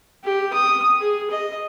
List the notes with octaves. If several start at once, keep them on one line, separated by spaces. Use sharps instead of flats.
G4
D#6
G#4
D#5